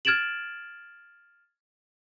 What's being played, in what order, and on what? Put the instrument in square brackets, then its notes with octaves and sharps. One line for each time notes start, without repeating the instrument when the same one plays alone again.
[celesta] F6 G#6 A6 D7 E7 F#7